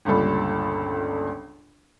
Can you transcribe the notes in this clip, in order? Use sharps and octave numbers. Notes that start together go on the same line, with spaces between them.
G1 C#2 A#2 G3 A4 B5